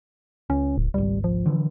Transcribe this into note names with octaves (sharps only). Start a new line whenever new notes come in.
C#2 C#4
D1
G#1 C#2 G3
F3
D3 E3 F#3